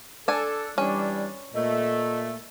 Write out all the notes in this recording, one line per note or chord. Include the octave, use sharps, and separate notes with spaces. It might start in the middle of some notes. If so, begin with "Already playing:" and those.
D4 A4 G#5
E3 G3 C#4 D4
A#2 A3 D#5